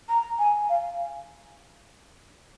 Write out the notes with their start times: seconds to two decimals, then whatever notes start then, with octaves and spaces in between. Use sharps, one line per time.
0.08 A#5
0.38 G#5
0.69 F5